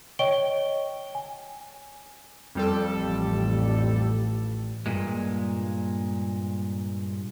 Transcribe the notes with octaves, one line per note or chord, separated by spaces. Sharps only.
C#5 D#5 G5 C#6 D7 G7
G#5
F2 G3 A4
A1
G2 A#2 G#3